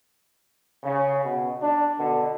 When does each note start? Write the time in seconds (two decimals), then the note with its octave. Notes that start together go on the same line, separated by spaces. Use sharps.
0.83 C#3
1.23 B2
1.62 D4
1.98 B2 D3